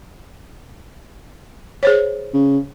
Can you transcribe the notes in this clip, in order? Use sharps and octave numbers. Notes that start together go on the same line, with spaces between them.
G#4 C5 C#5
C#3